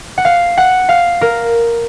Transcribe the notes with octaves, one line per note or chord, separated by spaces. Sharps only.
F#5
F5
F#5
F5
A#4